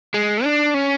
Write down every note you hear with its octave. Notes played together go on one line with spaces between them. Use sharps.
G#3
D4
C#4